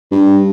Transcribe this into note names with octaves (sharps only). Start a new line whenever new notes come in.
G2